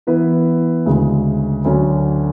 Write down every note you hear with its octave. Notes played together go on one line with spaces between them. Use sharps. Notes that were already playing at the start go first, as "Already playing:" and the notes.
E3 B3 E4 B4
D2 C#3 G#3
D2 D3 F#3 C#4